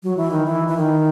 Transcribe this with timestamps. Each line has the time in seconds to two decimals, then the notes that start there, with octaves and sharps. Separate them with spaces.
0.03 F#3
0.17 E3
0.31 D#3
0.45 E3
0.68 E3
0.77 D#3